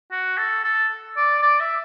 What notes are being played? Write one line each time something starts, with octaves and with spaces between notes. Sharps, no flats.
F#4
A4
A4
D5
D5
E5